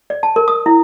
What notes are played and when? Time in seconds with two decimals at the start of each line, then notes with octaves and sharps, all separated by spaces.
0.10 D5
0.23 A5
0.36 A#4
0.48 D#6
0.66 E4